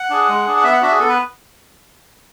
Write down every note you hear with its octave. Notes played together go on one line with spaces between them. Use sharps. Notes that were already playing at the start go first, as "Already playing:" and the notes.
Already playing: F#5
D4 G#4
G#3
D4 G#4
F#5
B3 E5
F#5
D4 F#4 E5
G#4
B3 A4
B4